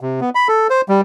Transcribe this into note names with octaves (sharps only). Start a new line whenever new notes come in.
C3
B3
B5
A4
C5
G3